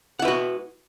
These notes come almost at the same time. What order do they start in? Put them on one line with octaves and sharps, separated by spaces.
F#5 E4 B4 F#4